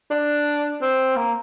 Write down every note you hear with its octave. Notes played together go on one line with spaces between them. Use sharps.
D4
C4
A#3